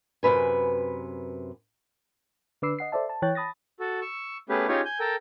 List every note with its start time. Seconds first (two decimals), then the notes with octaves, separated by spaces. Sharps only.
0.23 F#2 C3 F#3 B4 G#5
2.62 D3 D4 B4 D6 E6 C7
2.79 D#5 F#5 C7
2.92 A4 C5 D5 E5 A5
3.09 A5
3.22 E3 C#5 G5 F#6 A6
3.35 A5 B5 D#6 A6 A#6
3.80 F#4 A4
4.02 C#6 E6
4.49 A3 B3 C#4 G4 G#4 B4
4.68 C#4 D#4 F4 G4 G#4 C#5
4.85 G#5 G6
5.00 A4 A#4 G5